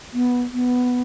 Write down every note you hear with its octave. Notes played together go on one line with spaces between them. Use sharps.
B3
B3